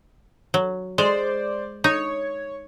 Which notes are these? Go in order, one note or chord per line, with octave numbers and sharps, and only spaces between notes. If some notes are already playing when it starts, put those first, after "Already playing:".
F#3
G#3 C5 D5
D#4 C#5